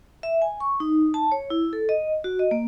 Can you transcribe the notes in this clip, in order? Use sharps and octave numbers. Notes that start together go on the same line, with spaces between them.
E5
G#5
C#6
D#4
A5
C#5
E4
A4
D#5
F#4
D#5
A#3